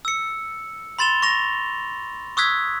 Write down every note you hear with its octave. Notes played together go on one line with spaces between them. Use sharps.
E6 C#7
B5 C6 A6 E7 F7 G7
C#6 A#6 F7
C#6 D#6 E6 F#6 G#6 B6